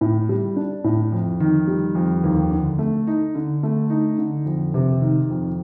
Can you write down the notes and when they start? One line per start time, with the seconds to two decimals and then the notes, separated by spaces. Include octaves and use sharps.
0.01 A2
0.29 G3
0.56 D4
0.84 A2
1.12 F2
1.40 D#3
1.68 G3
1.95 F2
2.24 D#2
2.51 D3
2.78 A3
3.07 D#4
3.35 D3
3.63 A3
3.90 D#4
4.18 D3
4.46 F2
4.74 C3
5.02 D#3
5.30 F2